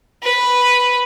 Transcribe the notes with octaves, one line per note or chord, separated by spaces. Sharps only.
B4